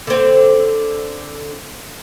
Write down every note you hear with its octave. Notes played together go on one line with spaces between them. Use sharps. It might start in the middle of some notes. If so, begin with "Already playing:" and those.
D3 C4